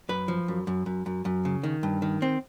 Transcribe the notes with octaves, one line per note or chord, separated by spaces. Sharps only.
F#2 B4
F3
F#2
F#2
F#2
F#2
F#2
C#3
D#3
G2
D#3
C4